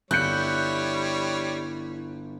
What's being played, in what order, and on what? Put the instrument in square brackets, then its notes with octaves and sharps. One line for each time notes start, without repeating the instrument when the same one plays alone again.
[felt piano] G1 [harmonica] G3 C#5 [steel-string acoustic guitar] E4 [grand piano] F#6 G6 C#7